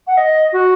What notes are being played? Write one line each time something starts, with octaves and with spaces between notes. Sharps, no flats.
F#5
D#5
F#4